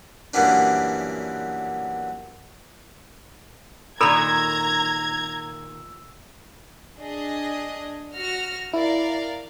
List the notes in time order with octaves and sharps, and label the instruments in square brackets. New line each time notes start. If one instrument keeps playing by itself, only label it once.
[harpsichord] F#2 A#2 E3 G3 B3 D4
[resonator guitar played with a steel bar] A#2 D#3 [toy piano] A4 B5 [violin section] A#5 G#6 [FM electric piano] E6
[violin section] D4 G#4 D#5
F#4 F6 A#6
[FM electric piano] E4 [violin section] A#4 D5 F5